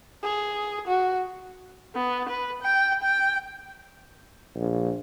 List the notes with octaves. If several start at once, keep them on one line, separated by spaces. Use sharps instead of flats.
G#4
F#4
B3
B4
G5
G5
A#1